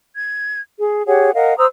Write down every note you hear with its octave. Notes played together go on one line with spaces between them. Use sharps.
G#6
G#4
G4 G#4 C#5 F#5
A#4 D#5 F5 F#5
C5 A#5 D#6 E6